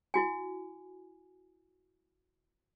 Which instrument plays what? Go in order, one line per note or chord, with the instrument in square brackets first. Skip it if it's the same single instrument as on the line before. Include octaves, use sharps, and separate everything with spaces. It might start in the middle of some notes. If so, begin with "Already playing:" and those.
[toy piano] E4 F#4 G#5